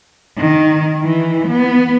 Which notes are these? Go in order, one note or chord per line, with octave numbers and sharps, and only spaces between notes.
D#3
E3
B3